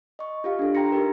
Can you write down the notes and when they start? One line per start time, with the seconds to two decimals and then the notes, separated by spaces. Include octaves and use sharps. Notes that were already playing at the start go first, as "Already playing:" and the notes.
0.19 D#5 C#6
0.44 F4 G4 F5
0.59 D4 A4
0.75 G5 A#5 C6 A#6 C#7
0.92 D#4 G4 A#4